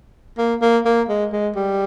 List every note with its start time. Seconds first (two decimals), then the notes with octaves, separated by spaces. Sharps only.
0.38 A#3
0.62 A#3
0.85 A#3
1.09 G#3
1.33 G#3
1.56 G3